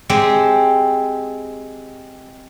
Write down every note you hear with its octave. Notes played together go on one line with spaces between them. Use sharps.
G#3 C4 G4